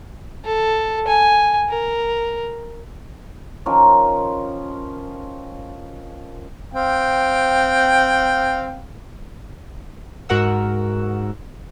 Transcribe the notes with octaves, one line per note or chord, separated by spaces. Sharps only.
A4
G#5
A#4
D#3 F3 C#4 A#4
C4 F5 G5
G#2 F#4 A#4 F#5 E6